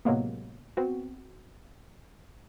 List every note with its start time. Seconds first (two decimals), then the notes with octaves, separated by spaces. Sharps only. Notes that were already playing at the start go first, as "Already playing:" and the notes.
0.05 A2 C3 F#3 G#3 A#3 B3
0.77 B3 C4 F#4